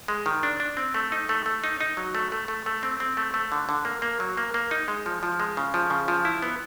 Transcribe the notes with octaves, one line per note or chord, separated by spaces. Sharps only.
G#3
D#3
D4
D4
C4
A3
D#4
A3
A3
D#4
D#4
F#3
A3
A3
A3
A3
C4
C4
A3
A3
D3
D3
A#3
A#3
F#3
A#3
A#3
D#4
G#3
F3
F3
G#3
C#3
F3
C#3
F3
E4
B3